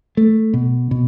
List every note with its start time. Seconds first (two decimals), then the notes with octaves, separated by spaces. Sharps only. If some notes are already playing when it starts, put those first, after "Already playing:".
0.17 A3
0.54 B2
0.91 B2